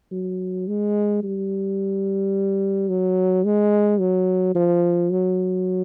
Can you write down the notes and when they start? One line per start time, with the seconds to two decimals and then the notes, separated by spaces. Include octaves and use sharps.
0.12 F#3
0.68 G#3
1.23 G3
2.89 F#3
3.45 G#3
4.00 F#3
4.55 F3
5.11 F#3